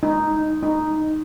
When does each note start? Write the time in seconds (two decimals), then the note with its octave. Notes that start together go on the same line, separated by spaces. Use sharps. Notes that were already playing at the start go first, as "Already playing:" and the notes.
0.03 D#4
0.63 D#4